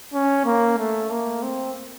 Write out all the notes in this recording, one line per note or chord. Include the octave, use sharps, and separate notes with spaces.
C#4
A#3
A3
A#3
C4